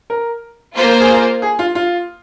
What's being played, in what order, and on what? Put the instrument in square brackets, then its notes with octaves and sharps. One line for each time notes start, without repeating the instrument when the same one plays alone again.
[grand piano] A#4
[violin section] A#3 F4 C5
[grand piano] A#4
G#4
A#4
G#4
F4
F4